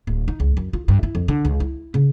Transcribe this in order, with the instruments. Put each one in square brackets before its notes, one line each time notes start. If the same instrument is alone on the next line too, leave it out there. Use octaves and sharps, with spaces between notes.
[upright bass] D1
D#4
C#2
F#2
F4
G2
E4
F2
D3
C#2
E4
C#3